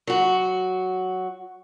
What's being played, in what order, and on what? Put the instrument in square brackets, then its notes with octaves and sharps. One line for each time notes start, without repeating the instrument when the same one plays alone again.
[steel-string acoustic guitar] F#3 F#4